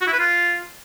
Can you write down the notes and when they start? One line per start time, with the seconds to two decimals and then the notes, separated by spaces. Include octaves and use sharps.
0.01 F#4
0.07 E4
0.13 B4
0.19 F4